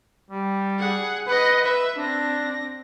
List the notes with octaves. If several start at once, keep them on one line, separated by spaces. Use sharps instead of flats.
G3
G#4 F#5
B4 D#5 F#5
B4 E5
C4 D4 A#6